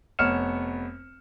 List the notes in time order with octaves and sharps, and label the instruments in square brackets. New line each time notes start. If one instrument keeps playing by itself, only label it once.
[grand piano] F1 B3 C#5 F6 C#7 E7